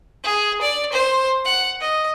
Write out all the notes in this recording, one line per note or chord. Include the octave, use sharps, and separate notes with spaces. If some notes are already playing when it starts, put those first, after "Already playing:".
G#4
D5
C5
F#5
D#5